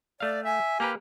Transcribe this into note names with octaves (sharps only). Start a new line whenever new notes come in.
A3 D5 F5
E5 G#5
A#3 G4 A#4 B4